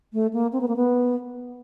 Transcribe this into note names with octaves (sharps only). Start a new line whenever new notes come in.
A3
A#3
C4
B3
A#3
B3